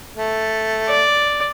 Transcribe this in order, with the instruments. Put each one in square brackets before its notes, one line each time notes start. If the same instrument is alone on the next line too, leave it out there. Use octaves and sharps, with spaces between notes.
[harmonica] A3
[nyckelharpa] D5